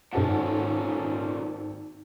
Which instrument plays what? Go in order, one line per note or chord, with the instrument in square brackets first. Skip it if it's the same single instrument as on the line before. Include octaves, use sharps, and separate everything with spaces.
[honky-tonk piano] G#1 A4 F#5 [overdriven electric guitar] A#2 C#4